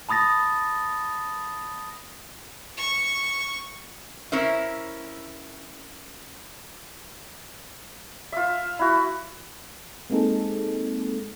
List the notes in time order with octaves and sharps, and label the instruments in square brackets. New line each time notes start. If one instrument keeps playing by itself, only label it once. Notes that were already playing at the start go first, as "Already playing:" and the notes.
[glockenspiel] A5 B5 D#6 A6 A#6
[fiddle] C#6
[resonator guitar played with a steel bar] C#4 E4 A#4 C5 E5
[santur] F4 E5
E4 F#4
[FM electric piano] G#3 A#3 C4 D#4 G#4 A4